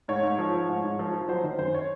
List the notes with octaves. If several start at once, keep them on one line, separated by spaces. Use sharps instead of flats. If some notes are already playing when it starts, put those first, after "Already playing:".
G#2 C#5
G#2
F3
F3
G#2
G#2
F3
F3
F#3 C5
D#3 C5
F#2 C5
C#5